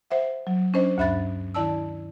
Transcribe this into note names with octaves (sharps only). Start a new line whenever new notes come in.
C5 E5 F#5
F#3
C#4 D4 C5 D#5
D2 G2 E5 B5 F#6 A6
D#3 E4 D5 A5 E6